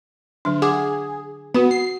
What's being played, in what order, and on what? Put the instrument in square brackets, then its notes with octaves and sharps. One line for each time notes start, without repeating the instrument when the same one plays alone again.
[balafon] D3 F#3 D4
[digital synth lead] G#4 [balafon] F#5 D6
[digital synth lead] B3 [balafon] F#4 B4 F#5
[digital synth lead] C7